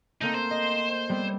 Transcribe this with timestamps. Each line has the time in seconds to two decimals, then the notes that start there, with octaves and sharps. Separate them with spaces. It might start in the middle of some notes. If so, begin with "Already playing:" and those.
0.21 A3 A#3 C4 D#4
0.34 C5
0.51 D#5
1.09 G3 B3 C4